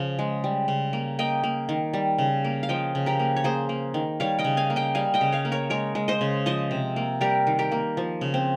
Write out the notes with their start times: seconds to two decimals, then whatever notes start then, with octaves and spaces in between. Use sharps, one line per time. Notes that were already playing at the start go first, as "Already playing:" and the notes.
Already playing: C#3 F3 C#5 F5
0.19 G#3
0.44 G3
0.68 C#3
0.93 A#3
1.19 A#3 D#5 G5
1.44 A#3
1.69 D#3
1.93 G3
2.18 C#3
2.44 A#3
2.63 F5
2.69 F3 D#5 G5
2.95 C#3
3.06 G4 A#4
3.19 A#3
3.36 C#5
3.44 A#3 G#4 C5
3.69 A#3
3.94 D#3
4.20 G3 C#5 F5
4.39 D#5 G5
4.44 C#3
4.57 F5 G#5
4.70 A#3
4.76 D#5 G5
4.95 G3 F5 G#5
5.14 D#5 G5
5.21 C#3
5.32 C#5 F5
5.45 A#3
5.52 A#4 C#5
5.70 G#3 A#4 C#5
5.95 G#3
6.08 C5 D#5
6.21 C#3
6.46 F3 C5 D#5
6.71 C3
6.96 A#3
7.21 G3 G4 A#4
7.47 D#3
7.59 G4 A#4
7.72 A#3
7.97 F3
8.21 C#3
8.34 C4